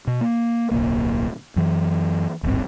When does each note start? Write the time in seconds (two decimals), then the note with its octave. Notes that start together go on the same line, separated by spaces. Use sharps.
0.07 B2
0.21 A#3
0.71 D1 B1 A#3
1.56 F#2 E3
2.43 D1 G#1 G2 C4